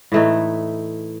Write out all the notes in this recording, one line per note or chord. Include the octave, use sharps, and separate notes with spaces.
A2 E3 A3 D#4